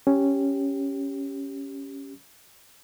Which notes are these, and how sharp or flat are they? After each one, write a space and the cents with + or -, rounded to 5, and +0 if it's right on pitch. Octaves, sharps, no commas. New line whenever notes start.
C#4 +0 G4 +0